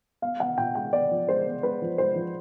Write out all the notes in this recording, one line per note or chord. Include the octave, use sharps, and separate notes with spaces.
B3 F5
B3 F#5
A#2 G5
G#3 G5
B3 D5
F3
G#3 C5
B3
G#3 B4
F3
G#3 C5
F3